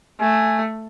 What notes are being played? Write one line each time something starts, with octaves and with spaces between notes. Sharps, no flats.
A3 G#5